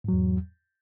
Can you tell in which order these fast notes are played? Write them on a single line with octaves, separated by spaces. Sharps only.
G#2 F#3 E2